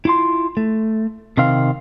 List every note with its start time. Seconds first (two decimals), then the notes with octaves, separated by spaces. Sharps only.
0.05 E4 F4 C6
0.57 A3
1.37 C3 D#3 C4 F5